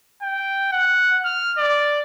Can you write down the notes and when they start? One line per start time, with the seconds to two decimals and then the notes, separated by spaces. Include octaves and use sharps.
0.23 G5
0.72 F#5
1.25 F6
1.58 D5